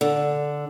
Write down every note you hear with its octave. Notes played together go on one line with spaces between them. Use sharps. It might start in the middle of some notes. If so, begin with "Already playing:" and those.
D3